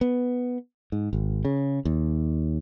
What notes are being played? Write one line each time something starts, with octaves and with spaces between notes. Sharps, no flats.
B3
G#2
G#1
C#3
D#2